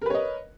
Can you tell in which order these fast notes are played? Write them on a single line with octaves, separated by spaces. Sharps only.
A#4 B4 C#5 D#5